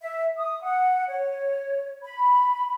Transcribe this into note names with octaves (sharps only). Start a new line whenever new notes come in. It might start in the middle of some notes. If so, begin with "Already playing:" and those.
E5
D#6
F#5
C#5
B5